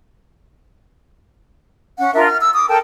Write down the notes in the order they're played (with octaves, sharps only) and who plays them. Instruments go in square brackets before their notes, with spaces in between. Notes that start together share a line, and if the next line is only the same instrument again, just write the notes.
[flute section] C#4 F#5
D4 F4 A#4 E5
F6
E6
D6 D#6
A4 A#4 G5 A5